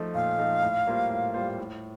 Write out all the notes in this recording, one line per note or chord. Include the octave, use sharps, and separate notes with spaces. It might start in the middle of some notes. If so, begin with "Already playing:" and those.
Already playing: F3 A3 D#4
A#2 F5
F3 A3 D#4
A2
G3 A#3 F4 C5
A2
G3 A#3 F4 C5
A2